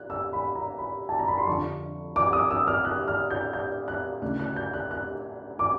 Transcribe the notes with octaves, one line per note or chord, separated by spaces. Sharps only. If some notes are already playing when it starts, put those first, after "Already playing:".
Already playing: F#6
E6
B5
A#5
B5
A5
A#5
B5
C6
F2 D3 F3 C#6
D6
D#6
E6
F6
F#6
F6
G6
G6
F#6
D2 C#3 E3 F#6
F#6
G6
F#6
F#6
D6